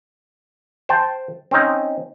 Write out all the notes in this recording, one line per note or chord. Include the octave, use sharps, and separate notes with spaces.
C5 G5 A5
C4 C#4 D#4